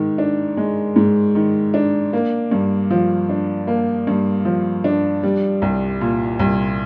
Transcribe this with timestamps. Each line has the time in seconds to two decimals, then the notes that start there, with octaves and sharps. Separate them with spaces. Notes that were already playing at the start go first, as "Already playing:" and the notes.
Already playing: G#2 D#3
0.18 D4
0.57 G#3
0.96 G#2
1.35 D#3
1.74 D4
2.13 A#3
2.51 G2
2.91 F3
3.29 D4
3.67 A#3
4.07 G2
4.45 F3
4.84 D4
5.23 G3
5.62 C2
6.01 A#2
6.39 C2